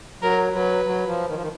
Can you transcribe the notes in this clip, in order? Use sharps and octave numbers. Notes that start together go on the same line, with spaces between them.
F#3 A#4
F#3 B4
F#3
F3
D#3
F3
D#3